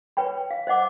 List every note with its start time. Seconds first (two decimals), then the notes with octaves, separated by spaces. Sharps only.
0.17 B4 C#5 G5 B5
0.51 F5
0.67 C5 D#5 F#5 D6